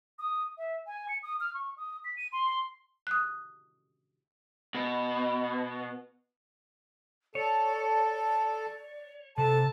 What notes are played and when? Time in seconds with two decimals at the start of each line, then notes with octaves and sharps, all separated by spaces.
0.19 D#6
0.58 E5
0.87 G#5
1.09 C#7
1.23 D#6
1.40 F6
1.54 C#6
1.78 D#6
2.05 B6
2.17 D#7
2.32 C6
3.07 D#6 F#6
4.75 B2
7.35 A4 C#5 D5
9.38 C3 A4 A5